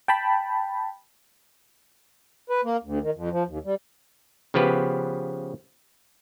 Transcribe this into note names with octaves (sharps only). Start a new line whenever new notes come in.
G5 A5 B5
B4
A#3
D2
D#3
F2
F3
D#2
G3
C#3 F3 B3 G4 B4